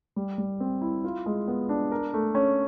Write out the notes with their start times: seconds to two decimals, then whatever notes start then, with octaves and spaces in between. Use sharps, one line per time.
0.16 G3
0.38 G3
0.60 C4
0.81 E4
1.04 F4
1.26 G#3
1.48 B3
1.69 D4
1.92 A#4
2.14 A3
2.35 C#4